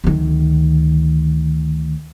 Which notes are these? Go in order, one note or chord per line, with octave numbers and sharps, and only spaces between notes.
D2 D#3